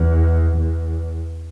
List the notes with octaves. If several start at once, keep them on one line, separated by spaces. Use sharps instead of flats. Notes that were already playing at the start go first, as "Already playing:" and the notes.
Already playing: E2
E2